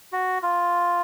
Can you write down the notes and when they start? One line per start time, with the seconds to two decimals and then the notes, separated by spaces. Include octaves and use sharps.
0.12 F#4
0.42 F4